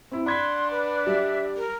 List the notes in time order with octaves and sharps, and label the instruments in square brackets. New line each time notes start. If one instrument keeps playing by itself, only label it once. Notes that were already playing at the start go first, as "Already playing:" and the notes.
[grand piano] C4 E4
[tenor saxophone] D4 [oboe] F#5 [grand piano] B5 G#6 B6 [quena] C6
[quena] B4
[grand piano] G3 [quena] E5
[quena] A#4